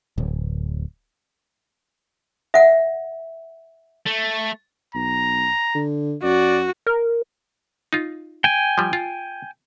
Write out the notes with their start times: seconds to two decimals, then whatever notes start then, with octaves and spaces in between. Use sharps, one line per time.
0.18 D1
2.54 E5 F#5
4.06 A3
4.95 B1 A#5
5.75 D3
6.23 F#2 F#4 D5
6.87 A#4
7.93 D#4 F4
8.44 G5 G#5
8.78 F3 G3
8.93 F4